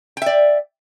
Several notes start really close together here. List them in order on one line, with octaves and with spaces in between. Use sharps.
G5 E5 D5